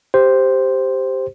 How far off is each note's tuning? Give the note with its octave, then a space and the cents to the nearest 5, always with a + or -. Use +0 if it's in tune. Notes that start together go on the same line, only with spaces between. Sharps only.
G4 +0 C5 +0